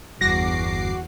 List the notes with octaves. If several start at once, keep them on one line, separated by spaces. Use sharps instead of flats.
G1 E2 F#4 D6 A#6 C7